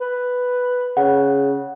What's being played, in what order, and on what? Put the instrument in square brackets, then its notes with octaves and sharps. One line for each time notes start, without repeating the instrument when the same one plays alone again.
[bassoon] B4
[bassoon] C#3 [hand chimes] F#5